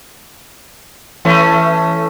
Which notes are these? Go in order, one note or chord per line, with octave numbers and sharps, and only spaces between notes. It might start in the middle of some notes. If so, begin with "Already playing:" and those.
E3 A3 C#4